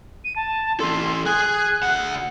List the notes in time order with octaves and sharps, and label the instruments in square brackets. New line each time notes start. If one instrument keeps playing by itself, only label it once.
[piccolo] D#7
A5
[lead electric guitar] E3 A4 [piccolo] C6
[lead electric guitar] G#4 G#5 [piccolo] F#6
[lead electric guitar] D2 F#5